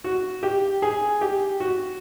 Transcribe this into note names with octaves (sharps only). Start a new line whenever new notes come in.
F#4
G4
G#4
G4
F#4